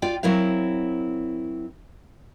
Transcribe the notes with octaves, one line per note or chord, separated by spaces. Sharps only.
F4 D5 G5
F#3 C4 E4 A#4 F5